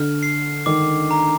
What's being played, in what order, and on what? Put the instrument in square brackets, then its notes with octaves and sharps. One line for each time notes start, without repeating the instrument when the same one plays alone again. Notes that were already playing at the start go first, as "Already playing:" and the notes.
Already playing: [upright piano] D3 [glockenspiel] F6
[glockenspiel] C7
[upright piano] D#3 [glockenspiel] D6
[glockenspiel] A#5